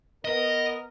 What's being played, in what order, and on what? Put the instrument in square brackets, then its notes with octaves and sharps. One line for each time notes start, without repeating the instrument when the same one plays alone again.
[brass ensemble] B3 A#4 [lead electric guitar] D#5